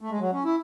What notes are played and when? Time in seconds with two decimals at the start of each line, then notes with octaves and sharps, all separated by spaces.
0.01 A3
0.10 G#3
0.20 F#3
0.32 C#4
0.44 E4